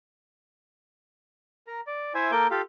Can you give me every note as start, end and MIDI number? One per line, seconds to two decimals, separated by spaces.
1.67 1.81 70
1.67 1.81 82
1.87 2.13 74
2.14 2.31 64
2.14 2.31 72
2.14 2.31 76
2.14 2.31 80
2.32 2.47 58
2.32 2.47 69
2.32 2.47 70
2.32 2.47 86
2.32 2.47 91
2.51 2.62 65
2.51 2.62 67
2.51 2.62 69
2.51 2.62 77